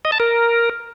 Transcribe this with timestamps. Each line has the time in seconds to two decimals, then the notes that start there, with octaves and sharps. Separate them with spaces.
0.05 D#5
0.12 A5
0.20 A#4